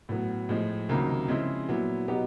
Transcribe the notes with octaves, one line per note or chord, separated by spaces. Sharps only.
A2 F#3 B3
A2 F3 G#3
C#2 C3 D#3 F#3 A#3
C#3 F3 G#3 C4 E4
A#2 F#3 B3 E4
B2 F#3 B3 D#4 G4